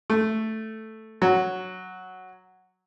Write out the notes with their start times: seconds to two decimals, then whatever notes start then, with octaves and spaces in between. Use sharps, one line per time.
0.10 A3
1.22 F#3